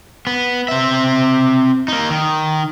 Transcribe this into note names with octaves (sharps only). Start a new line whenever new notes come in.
B3
C4 E5
A#3 D#4
D#3